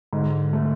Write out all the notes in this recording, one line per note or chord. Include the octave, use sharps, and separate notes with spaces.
G#2 D3
A3